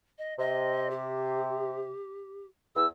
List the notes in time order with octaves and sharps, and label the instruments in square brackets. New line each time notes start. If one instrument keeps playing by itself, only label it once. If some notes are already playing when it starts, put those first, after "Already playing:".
[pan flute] D#5
[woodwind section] C3 [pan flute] D#5
[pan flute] G4
[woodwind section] E2 [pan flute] E6